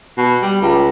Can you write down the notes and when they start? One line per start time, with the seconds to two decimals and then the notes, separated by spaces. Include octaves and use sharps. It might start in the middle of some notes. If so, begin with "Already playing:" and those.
0.18 B2
0.42 G3
0.61 C#2